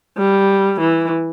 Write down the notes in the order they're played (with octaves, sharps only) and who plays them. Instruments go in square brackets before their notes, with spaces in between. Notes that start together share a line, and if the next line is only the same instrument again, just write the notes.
[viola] G3
E3